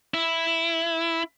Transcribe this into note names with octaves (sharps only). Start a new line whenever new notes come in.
E4